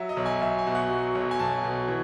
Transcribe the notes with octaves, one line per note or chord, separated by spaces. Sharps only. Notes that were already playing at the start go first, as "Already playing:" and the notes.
Already playing: F#3 E5
D#5
B1
G#5
B1 E5
G#5
B2
F#5
F#3
B1
G#5
B1 A5
B2
E3